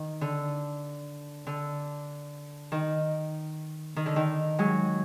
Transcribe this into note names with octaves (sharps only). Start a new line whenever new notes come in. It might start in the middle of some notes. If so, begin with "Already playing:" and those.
Already playing: D#3
D3
D3
D#3
D#3
D3
D#3
F#3 G#3